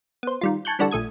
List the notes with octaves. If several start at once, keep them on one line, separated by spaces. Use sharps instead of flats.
B3 C5
D#3 G3 F4
G#5 A5 C#6 F#6 G6
D3 E3 G3 D4 F#4 A4
A#1 A3 D#6 G#6